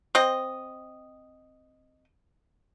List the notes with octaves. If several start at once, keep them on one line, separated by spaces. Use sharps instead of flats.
C4 D#5